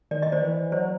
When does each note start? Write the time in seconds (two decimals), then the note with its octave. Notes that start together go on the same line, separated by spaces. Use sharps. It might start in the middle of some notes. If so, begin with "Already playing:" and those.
0.11 D#3 D5
0.22 D#3 D#5
0.32 C5 D5
0.42 E3
0.72 F#3 C5 D5